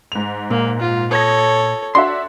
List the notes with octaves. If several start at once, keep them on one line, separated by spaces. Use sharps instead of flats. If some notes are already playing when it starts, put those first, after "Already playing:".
G#2 F7
A#2 A#3
F4
A4 C#5 D#6 G#6 A#6
D4 F#4 E5 C6